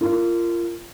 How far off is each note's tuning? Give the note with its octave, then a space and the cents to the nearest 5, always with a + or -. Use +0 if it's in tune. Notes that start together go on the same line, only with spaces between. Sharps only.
F4 -25 A#4 -15